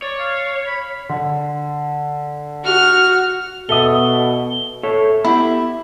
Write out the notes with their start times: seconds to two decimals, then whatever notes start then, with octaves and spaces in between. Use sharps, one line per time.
0.02 C#5 D5
0.19 F5
0.67 B5
1.09 D3
2.64 F#4 F6
3.69 B2 A4 E5 D#6 G7
4.83 A4 C#5 E5
5.24 B3 E4 G4